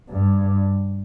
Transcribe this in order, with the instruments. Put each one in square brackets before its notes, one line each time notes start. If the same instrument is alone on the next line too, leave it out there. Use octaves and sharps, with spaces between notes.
[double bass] G2